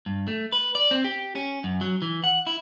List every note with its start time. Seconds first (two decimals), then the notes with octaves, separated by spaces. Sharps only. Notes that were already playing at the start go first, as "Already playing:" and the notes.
0.06 G2
0.28 A3
0.52 B4
0.75 D5
0.91 C4
1.04 G4
1.35 C#4
1.64 F#2
1.81 F#3
2.02 E3
2.24 F#5
2.47 E4